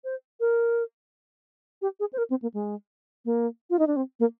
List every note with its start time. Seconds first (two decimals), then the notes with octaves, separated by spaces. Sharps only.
0.04 C5
0.40 A#4
1.82 G4
2.00 G#4
2.13 C5
2.18 A#4
2.30 C4
2.42 A#3
2.54 G#3
3.25 A#3
3.70 F4
3.79 D#4
3.87 D4
3.96 C4
4.20 A#3